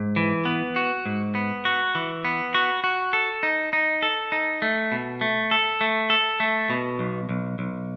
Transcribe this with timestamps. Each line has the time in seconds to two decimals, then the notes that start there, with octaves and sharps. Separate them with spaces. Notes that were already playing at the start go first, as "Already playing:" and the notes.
Already playing: G#2
0.16 E3
0.45 B3
0.76 F#4
1.06 G#2
1.35 B3
1.65 F#4
1.95 E3
2.25 B3
2.54 F#4
2.84 F#4
3.13 A4
3.43 D#4
3.73 D#4
4.02 A4
4.32 D#4
4.62 A3
4.92 B2
5.21 A3
5.51 A4
5.81 A3
6.10 A4
6.40 A3
6.70 B2
6.99 B1
7.29 B1
7.59 B1